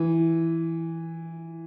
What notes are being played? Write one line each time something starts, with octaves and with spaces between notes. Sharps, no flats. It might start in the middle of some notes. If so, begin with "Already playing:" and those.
Already playing: E3